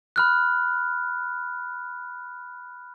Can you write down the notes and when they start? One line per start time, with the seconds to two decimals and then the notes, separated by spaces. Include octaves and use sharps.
0.16 B5 F6 F#6